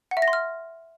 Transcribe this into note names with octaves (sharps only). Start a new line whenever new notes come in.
F#5
E5
A#6
C6
F6